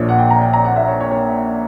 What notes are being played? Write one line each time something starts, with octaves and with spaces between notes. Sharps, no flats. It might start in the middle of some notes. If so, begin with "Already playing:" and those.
Already playing: A#1 A#2 C#5
F#5
G5
A#5
G5
A#5
F#5
E5
C#5
C#5
C#5